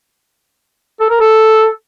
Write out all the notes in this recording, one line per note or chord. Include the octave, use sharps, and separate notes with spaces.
A4
A#4
A4